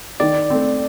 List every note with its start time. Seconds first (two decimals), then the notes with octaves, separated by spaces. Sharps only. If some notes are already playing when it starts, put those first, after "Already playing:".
0.20 D#3 D5
0.50 A3 C4